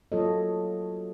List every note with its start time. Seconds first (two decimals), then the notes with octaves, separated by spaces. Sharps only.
0.12 F#3 A#3 F4 A4 C#5 D#5